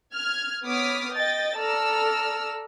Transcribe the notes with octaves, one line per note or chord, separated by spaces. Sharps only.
F6 G#6
B3 C#5 D6 D#6 F6 B6
D#5 G5 A6
A4 D5 A#5 E6 F6